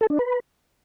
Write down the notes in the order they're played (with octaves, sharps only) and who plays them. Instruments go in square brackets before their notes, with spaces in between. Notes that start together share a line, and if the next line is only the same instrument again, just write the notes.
[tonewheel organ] A4
D4
B4